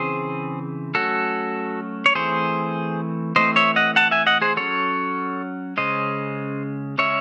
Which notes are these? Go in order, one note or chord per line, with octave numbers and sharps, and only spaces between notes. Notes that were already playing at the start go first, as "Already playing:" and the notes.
Already playing: C#3 E3 C4 G#4 C5
F#3 A3 C#4 F#4 A4
C#5
E3 A3 C4 G#4 C5
E3 A3 C4 C5 D#5
C#5 E5
D#5 F#5
F#5 A5
E5 G#5
D#5 F#5
G#4 C5
F#3 C#4 A4 C#5
C#3 G#3 C#4 C5 D#5
C#3 G#3 C#4 C#5 E5